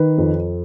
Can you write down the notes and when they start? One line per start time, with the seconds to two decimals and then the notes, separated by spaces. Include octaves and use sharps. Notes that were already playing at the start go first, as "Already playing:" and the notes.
Already playing: D#3 B4
0.18 F2